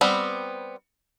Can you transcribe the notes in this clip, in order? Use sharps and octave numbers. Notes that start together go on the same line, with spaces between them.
G3 B3 C4